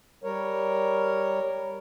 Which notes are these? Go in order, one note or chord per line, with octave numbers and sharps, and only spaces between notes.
G3 A#4 C#5